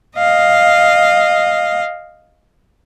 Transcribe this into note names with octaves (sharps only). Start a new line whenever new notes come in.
D#5 F5